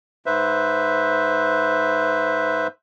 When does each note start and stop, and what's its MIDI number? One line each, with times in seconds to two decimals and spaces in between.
0.26 2.67 44
0.26 2.67 71
0.26 2.67 72
0.26 2.67 76